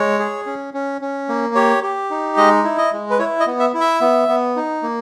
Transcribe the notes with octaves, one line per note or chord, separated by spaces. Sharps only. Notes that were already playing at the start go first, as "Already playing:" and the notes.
Already playing: G#3 C#5
G#4
C#4
C#4
C#4
A#3
G4 C#5
G4
D#4
G#3 D#5
E4
D#5
G#3
B4
E4 C#5
D#5
B3
E5
E4
E5
B3
B3
D#4
A#3